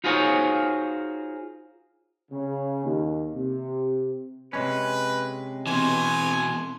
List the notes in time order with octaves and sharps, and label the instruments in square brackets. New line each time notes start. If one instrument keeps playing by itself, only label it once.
[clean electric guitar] D#4 F4 F#4 G#4 C5 C#5
[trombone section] C#3
D#2
C3
[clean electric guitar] C3 G#3 C#4 [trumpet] B4
[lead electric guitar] B2 E3 [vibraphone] C4 [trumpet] G#5